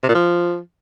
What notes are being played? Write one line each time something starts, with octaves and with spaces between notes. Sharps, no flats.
C3
A#2
F3